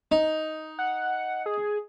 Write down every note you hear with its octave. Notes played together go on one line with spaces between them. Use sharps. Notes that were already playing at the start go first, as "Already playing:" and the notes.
D#4
F#5
G#4